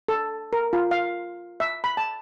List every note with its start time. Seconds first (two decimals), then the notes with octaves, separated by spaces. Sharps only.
0.08 A4
0.53 A#4
0.73 F4
0.91 F5
1.60 E5
1.84 B5
1.97 A5